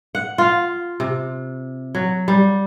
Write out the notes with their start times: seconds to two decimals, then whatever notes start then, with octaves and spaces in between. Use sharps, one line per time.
0.15 F#5
0.38 F4
1.00 C3
1.95 F#3
2.28 G3